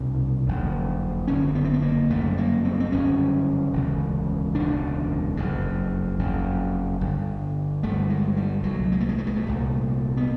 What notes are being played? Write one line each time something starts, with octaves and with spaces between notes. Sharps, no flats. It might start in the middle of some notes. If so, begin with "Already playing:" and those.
Already playing: C2 B2 C#4
F#1 F2 D3
F#1 F2 D3 C#4
C4
B3
C4
B3
A#3
G1 F#2 C#3 A3
A#3
C4
C4
G1 F#2 C#3 C#4
E1 D2 C#3
E1 D2 C#3 D4
F#1 F2 C#3
F#1 F2 C#3
G1 G2 D3
G1 G2 D3 A3
G#3
G3
C2 A#2 F#3
G#3
A3
G#3
A3
G#3
A3
C2 A#2
B3